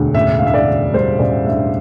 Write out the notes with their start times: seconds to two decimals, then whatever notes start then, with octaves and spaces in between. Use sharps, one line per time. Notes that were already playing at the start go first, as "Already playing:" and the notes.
Already playing: E1 D2
0.15 A1 E5
0.39 G2 F5
0.47 E5
0.54 D5
0.67 D3
0.93 G3 C5
1.19 A1 D5
1.46 G2 E5